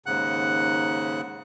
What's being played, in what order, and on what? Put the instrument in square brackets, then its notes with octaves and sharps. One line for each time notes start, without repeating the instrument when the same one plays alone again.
[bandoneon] D#2 G#2 C#3 F#5 F#6